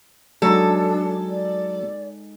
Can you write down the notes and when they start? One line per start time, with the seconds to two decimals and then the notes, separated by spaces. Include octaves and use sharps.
0.42 F#3 G#3 D4 D#4 A4
1.29 D5